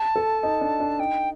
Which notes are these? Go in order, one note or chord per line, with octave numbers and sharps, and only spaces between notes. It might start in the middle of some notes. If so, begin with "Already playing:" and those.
Already playing: A5
A4
D#4
D4
D4
D#4 G5